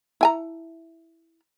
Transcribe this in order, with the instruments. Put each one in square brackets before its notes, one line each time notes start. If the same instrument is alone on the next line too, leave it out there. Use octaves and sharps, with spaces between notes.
[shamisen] E4 G#5 A#5